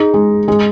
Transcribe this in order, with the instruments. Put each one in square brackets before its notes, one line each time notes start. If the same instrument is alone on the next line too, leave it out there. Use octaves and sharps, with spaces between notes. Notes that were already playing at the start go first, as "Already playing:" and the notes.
Already playing: [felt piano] D#4 [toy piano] G#4
[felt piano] G#3
G#3